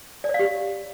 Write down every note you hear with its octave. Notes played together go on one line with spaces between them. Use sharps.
D5
C#5
F5
G4